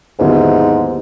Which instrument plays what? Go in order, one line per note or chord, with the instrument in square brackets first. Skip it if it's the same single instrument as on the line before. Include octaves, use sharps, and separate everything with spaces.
[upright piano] D#2 D3 F#3 B3 E4 [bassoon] G#2